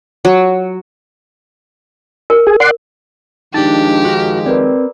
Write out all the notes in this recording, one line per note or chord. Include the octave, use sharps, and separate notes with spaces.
F#3
A#4
G#4
D5 F#5 C6
D#3 F3 G#3 D4 D#4 G4 A5
F#4 A#4
C4 A#4 B4 D5